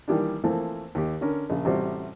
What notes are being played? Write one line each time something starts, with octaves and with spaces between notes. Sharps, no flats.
D#3 E3 G3 A#3 D4
E3 F3 A3 A#3 C4
D#2 G4
D3 C#4 A#4
A#1 C#3
A1 C3 G3 F#4 C5